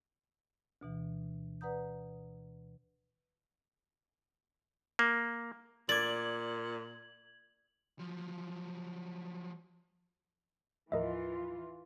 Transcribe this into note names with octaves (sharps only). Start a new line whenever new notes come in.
D2 B2 E3
B4 D5 F#5 A#5 D#6 G6
A#3
A#2 D5 G#6 F#7
F3 F#3
D#2 A2 E3 F3 F4 A#4 D#5 E5